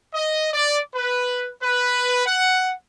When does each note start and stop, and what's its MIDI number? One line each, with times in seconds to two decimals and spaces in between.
0.14 0.50 75
0.53 0.79 74
0.95 1.50 71
1.63 2.25 71
2.26 2.72 78